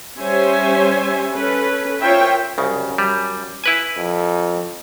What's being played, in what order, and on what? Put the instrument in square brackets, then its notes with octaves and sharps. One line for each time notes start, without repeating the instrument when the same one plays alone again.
[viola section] G3 C#4 C5 C#5 E5 G#5
C#4 A4 B4
F4 A#4 C5 C#5 E5 G5
[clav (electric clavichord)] C2 C#3 [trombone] F#2
[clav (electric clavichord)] G3
E4 B4 G#5
[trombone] F2